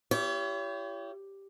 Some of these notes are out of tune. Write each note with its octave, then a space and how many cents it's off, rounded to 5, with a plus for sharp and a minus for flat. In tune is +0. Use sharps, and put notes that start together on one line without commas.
E4 +45 G4 +0 C#5 +35